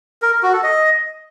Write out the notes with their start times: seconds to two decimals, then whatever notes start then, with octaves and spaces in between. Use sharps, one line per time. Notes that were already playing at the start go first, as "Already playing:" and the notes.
0.22 A#4
0.32 A#4
0.43 F#4
0.53 A4
0.63 D#5